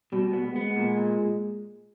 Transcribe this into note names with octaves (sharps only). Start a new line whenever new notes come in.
B2 G3
B3
G#3
B3
A#2